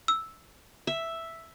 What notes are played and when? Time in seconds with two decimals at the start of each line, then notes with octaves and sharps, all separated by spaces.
0.08 E6
0.87 E5